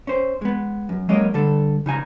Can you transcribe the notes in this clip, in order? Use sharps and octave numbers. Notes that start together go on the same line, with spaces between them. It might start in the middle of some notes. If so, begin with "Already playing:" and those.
C#4 C5
G#3 B3
F#2
F#3 G#3 A#3 C#4 A#4 D#5
D3 G3 A4
C#3 D#4 G#5 A#5